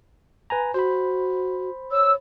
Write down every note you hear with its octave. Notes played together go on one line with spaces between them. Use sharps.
B4 G#5 A#5
F#4 C5 B5
C#5 E6